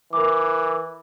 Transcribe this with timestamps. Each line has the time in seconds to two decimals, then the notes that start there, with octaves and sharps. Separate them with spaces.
0.13 E3 A#4 D6